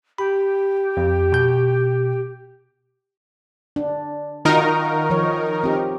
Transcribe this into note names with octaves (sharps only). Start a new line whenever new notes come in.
G4 B5
F2
B2 G6
D4
D#3 D#4 F4 F#4 A#4
F3 C#5
C4 G4